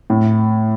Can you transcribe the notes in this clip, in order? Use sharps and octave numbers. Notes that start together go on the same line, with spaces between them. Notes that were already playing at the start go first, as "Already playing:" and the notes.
A2